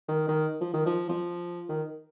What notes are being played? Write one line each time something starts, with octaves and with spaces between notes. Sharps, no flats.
D#3
D#3
F3
D#3
F3
F3
D#3